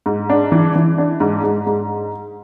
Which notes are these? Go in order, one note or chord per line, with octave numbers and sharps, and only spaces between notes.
G#2
D4
E3
E3
D4
G#2
G#2
G#2